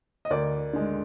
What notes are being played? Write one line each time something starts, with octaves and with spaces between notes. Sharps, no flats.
D#5
D2 A#4 D5
D3 G#3